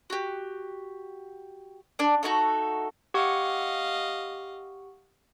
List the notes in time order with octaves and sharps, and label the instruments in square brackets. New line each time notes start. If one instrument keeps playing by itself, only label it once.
[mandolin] F#4 G4
D4 D5
A3 D#4 F#4 A4
[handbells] G4 F#5 C#6 [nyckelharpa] D#5 F5